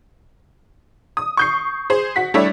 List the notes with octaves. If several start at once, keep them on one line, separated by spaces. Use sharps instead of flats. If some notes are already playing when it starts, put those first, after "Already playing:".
D#6
C#6 G6 C7
G#4 C5
F#4 B6
G3 A3 D4 E4 C#5 E5